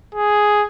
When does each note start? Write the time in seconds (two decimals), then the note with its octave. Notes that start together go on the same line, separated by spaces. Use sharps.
0.15 G#4